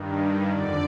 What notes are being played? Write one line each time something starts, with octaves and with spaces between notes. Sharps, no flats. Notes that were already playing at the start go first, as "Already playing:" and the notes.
Already playing: G2 D#3
F2 D3 D5